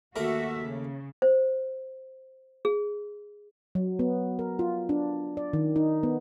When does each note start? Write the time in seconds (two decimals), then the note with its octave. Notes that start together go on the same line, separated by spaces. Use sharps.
0.16 D#2 A3 F#4 A#4 E5
0.63 C#3
1.22 C5
2.65 G#4
3.75 F#3
3.99 B3
4.39 A#4
4.59 F4
4.89 D4
5.37 D5
5.53 D#3
5.76 D#4
6.03 B3